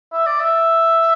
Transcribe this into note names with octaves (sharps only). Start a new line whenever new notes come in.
E5
D5
E5